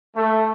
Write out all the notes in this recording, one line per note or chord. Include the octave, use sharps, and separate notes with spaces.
A3